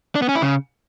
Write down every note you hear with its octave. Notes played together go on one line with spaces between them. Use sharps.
D4
B3
C#4
E4
C#3